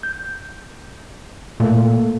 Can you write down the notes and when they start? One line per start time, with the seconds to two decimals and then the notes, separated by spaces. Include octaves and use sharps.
0.03 G6
1.60 A#2 A3 A#3 A4